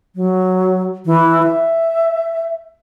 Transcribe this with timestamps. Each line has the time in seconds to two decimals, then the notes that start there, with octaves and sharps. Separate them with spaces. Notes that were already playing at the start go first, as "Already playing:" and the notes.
0.16 F#3
1.06 E3
1.43 E5